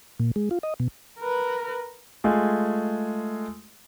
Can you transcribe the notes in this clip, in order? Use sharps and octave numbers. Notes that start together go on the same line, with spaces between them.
A#2
G#3
F4
D#5
B2
A#4 B4
G#3 A3 F4 G#4